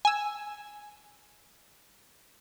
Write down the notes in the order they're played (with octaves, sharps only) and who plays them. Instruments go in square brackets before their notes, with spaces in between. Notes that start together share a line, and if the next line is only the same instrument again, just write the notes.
[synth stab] G#5 E6